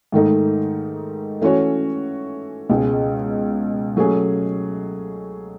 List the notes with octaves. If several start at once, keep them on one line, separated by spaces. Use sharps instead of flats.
G#2 D#3 A3 D#4
E3 A3 C#4 F#4 C#5
C#2 B2 G#3
F#3 A3 C#4 G#4